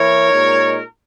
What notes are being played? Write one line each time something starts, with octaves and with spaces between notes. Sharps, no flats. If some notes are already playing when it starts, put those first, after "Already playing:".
Already playing: E3 A#3 E4 A#4 C#5
A#2 G#3 D#4